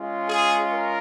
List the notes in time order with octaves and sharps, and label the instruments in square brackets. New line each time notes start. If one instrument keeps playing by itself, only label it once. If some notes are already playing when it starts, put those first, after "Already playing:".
Already playing: [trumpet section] G#3 C#4 F4
G#4
A#4